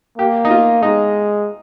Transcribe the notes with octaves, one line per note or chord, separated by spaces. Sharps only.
A#3 G4
D#4
F4
G#3 D#4